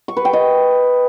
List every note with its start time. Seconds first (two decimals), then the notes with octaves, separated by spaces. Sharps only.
0.08 C#6
0.17 B4
0.25 G5
0.33 D#5